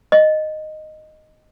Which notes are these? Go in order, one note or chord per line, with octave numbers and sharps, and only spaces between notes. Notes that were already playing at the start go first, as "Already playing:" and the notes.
D#5